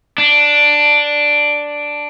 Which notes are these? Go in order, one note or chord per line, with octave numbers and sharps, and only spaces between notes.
D4